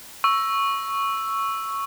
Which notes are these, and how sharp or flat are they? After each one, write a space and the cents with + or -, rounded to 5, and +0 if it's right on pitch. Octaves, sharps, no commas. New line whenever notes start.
C#6 +0 E6 +0